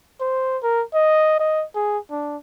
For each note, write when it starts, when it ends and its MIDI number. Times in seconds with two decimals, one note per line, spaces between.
0.20 0.58 72
0.63 0.83 70
0.94 1.38 75
1.39 1.65 75
1.75 1.98 68
2.11 2.37 62